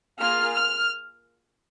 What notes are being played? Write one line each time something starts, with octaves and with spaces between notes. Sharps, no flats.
A#3 F4 G#4 F6
F6